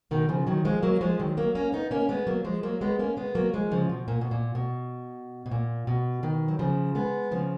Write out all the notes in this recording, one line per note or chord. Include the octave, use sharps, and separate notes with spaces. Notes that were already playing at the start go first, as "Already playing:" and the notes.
B2 D#3
C#3 F3
D#3 F#3
F3 G#3
F#3 A#3
F3 G#3
D#3 F#3
F#3 A#3
A#3 C#4
B3 D#4
A#3 C#4
G#3 B3
F#3 A#3
F3 G#3
F#3 A#3
G#3 B3
A#3 C#4
G#3 B3
F#3 A#3
F3 G#3
C#3 F3
B2
A#2
B2
A#2
B2
B2
A#2
B2
B2 D#3
F#3
C#3 F3
G#3 B3
C#3 F3